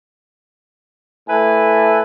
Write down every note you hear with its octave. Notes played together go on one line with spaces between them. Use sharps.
A2 A4 B4 E5 G#5 A5